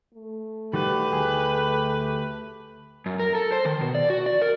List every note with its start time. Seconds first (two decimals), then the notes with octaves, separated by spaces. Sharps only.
0.14 A3
0.73 D#3 G3 F#4 G4 B4
1.11 D2 G#4
3.06 F#2
3.19 A#4
3.35 A4
3.52 C5
3.65 D#3
3.81 B2
3.95 D5
4.10 F#4
4.26 D5
4.42 A#4